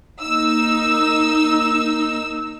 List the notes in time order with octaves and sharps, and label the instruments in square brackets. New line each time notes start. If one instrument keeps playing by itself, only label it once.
[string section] A#3 D#4 E6